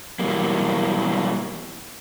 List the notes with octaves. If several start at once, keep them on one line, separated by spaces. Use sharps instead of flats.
B2 E3 F#3 G3 A#3